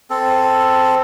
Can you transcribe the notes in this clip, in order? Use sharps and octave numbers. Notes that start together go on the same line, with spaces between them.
C4 A4